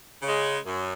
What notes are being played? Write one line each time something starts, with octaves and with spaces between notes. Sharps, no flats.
C#3 G#3
F#2